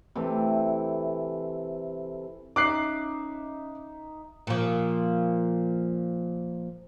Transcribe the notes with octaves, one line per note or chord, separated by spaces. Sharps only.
C3 E3 A3
C#4 D#4 E5 D6 F#6 C7
A#2 F3